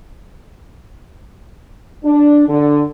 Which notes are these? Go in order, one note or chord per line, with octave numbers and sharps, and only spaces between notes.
D4
D3